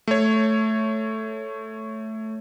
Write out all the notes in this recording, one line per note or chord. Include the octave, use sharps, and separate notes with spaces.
A3 C#5